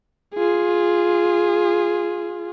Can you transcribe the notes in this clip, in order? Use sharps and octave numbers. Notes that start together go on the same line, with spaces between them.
F4 G#4